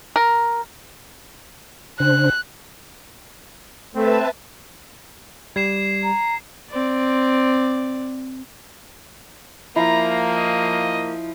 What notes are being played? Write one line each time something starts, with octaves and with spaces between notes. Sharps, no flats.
A#4
C#3 D4 C5 F#6
A3 C4 B4 E5 A5
G3 G#6 C7 E7
A#5
C4 D5
F3 A#3 E4 A#5
D#5